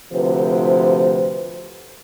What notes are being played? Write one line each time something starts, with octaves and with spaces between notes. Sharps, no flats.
D2 C3 F3 B4 C5